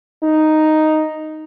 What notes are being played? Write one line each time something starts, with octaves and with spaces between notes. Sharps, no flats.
D#4